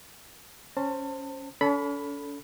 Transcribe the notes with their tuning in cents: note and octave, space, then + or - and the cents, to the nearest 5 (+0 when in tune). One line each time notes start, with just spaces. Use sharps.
C#4 +0 C5 +10 A5 +30
C#4 +45 A4 +0 B5 +0